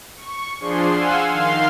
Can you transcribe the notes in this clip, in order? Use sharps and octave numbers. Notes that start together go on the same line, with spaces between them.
C#6
F3 D4 G#4 C6
F5 F#5 G#5 C6 E6
D#3 F5 C6 C7